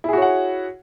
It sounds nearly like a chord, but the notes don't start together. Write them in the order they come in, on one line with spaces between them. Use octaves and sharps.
E4 G#4 F#4 C#5 F#5